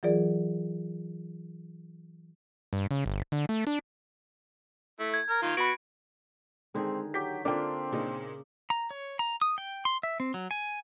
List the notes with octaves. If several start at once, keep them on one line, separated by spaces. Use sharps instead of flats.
E3 F#3 F4 G#4 A#4 D5
G2
C#3
G1
D3
A3
D4
A3 E4
G#6
A#4 F6
D#3 F4
B3 F#4 B5 D7
D3 D#3 G#3 C4 G#4
F#3 G4 D6 G6 B6
D3 A#3 C4 D4 F4 G5 D6
A#2 C#3 D#4
A#5
C#5
A#5
D#6
G5
C6
E5
C4
F#3
G#5